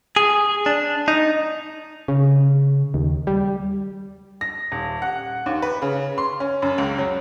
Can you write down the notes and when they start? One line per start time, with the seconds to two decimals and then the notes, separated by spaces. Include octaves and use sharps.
0.16 G#4
0.66 D4
1.08 D#4
2.08 C#3
2.94 D#2
3.27 G3
4.41 A#6
4.72 D#1
5.02 F#5
5.46 D#2
5.62 B4
5.82 C#3
6.18 C6
6.40 C#4
6.62 F#2
6.78 C#2
6.98 F#3